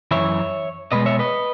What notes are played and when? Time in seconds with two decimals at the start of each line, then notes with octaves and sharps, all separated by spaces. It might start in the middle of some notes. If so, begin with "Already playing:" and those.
0.11 F#2 C#3 E3 C#5 E5
0.92 B2 G#3 B4 D#5
1.06 C#5 E5
1.19 B4 D#5